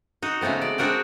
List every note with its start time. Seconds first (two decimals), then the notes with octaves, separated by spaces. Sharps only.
0.22 D#4 F#4
0.41 C#3 G#3 A3 B3 C4
0.62 D5
0.78 G#3 C4 D4 F#4 A#4 G5